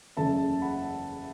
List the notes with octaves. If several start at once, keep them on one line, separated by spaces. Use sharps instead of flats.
F#1 E2 C#3 A3 E5 A5
F#5 B5